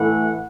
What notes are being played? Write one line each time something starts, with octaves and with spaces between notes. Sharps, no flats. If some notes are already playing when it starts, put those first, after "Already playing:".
Already playing: A2 E3 A3 F#5